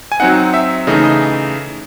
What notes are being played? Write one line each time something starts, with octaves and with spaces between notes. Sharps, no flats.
G#5
F#3 C4 D#4 F#5
E5
C#3 E3 A3 D#4 D#5
D#5